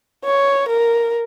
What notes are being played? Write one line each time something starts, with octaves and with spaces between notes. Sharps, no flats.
C#5
A#4